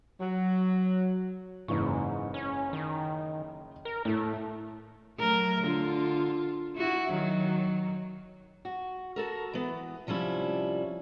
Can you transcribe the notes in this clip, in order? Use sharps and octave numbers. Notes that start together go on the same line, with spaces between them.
F#3
F#1 G#2 E3 C#6
C#4
D#3
A#4
A2 A3
F#3 A3 A#4
D3 F4
E4 F#4
D#3 F#3
F#4
F#4 A4 A#4
E3 B3
C3 F3 G3 C#4 E4